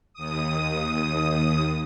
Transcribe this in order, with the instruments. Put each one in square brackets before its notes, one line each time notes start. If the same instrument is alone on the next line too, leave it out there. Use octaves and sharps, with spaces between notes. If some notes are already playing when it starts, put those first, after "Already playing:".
[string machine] D#2 D#6